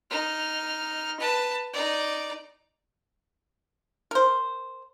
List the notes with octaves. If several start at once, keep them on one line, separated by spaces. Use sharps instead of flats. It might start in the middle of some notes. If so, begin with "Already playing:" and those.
D#4 F6
B4 A5
D#4 D5
A#4 C5